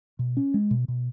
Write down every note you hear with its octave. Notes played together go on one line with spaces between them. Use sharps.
B2
C#4
G#3
B2
B2